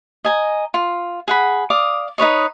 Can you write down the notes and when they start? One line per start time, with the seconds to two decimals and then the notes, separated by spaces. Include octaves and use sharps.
0.24 D#5 G#5 A#5
0.74 F4
1.28 G#4 F#5 B5
1.70 D5 F5 D6 D#6
2.18 D#4 B4 C#5 D#5